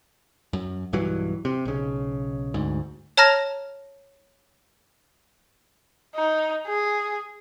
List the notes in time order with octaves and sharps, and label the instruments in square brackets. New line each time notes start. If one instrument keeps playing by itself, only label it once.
[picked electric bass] F#2
B1 G2 E3 F#3
C3
B1 C#3
D2 G#2
[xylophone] C#5 A5 A#5 F6 A#6
[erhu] D#4
G#4